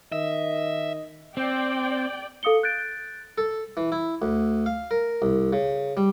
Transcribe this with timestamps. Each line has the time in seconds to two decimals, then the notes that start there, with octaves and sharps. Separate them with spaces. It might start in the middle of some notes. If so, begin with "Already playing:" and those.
0.12 D#3 D#5 E5
1.37 C4 D5 G5
2.43 A4 F5 D#6 C#7 G7
2.63 F#6 G6 A6 D7
3.38 A4
3.77 E3
3.92 E4
4.22 D2
4.66 F5
4.91 A#4
5.22 C2
5.53 C#3
5.97 G3